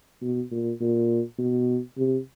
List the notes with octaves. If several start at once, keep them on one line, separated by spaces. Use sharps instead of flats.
B2
A#2
A#2
B2
C3